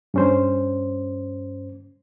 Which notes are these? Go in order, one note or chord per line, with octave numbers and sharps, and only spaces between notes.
G2 C#4 C5